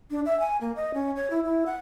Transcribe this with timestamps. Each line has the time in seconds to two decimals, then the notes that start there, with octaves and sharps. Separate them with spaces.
0.11 D4
0.26 E5
0.40 G#5
0.61 A#3
0.76 D#5
0.94 C#4
1.16 C#5
1.30 E4
1.44 E4
1.66 F#5